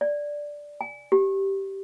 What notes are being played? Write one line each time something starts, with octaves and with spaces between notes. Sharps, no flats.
D5
G#5
G4